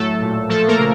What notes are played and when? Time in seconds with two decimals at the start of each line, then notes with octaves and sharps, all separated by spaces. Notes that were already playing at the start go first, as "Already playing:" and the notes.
Already playing: A2 F#3 A3 A4
0.21 A#2
0.49 F3 A3 A4
0.68 A#3 A#4
0.78 C#3